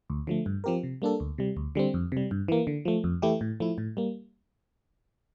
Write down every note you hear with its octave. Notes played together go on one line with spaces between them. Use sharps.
D2
D3 F3 A3
G2
F3 C4 G4 A#4
C3
G3 A#3 D4 A4
D2
C3 G3
D2
D3 G3 C4
F2
C3 G3
G2
E3 A#3
D3
F3 A3
F2
E3 A3 E4 G4
A2
F3 A3 E4
A2
G3 A#3